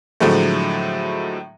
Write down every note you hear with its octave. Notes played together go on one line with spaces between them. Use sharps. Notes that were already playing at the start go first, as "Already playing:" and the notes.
A2 D3 F3 F#3 G#3 A3